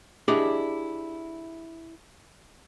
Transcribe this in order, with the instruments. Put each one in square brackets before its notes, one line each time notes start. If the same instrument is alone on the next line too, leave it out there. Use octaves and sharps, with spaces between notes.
[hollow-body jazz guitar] D4 E4 G4 G#4 D5 D#5